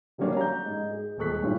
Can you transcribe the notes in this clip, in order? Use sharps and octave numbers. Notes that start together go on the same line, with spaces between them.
D3 F#3 G3 A#3 C#4 D4
A#5 G6
G#2
G#4
D#1 G#3 A4 C#6 F#6 B6
G2 A#2 F3 G3 C#4 E4